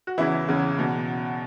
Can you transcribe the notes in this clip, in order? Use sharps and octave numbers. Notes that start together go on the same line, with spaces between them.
F#4
E2 C#3 E3 E4
E2 C#3 E3
E2 B2